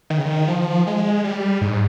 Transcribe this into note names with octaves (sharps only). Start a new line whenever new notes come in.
D#3
C#3
D#3
F3
G#3
G3
G#2